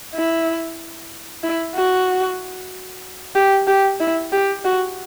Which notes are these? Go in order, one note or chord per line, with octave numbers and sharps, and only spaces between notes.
E4
E4
F#4
G4
G4
E4
G4
F#4